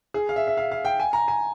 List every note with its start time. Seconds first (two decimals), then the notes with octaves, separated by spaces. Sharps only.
0.14 G#4
0.29 F5
0.36 E5
0.47 E5
0.57 F5
0.71 F5
0.85 G5
1.00 G#5
1.13 A#5
1.28 G#5